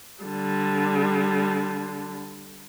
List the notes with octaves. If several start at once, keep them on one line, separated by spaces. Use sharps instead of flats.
D3 G3